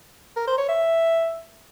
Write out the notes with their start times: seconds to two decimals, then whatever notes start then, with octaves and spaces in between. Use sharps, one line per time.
0.37 A#4
0.47 C5
0.58 C#5
0.69 E5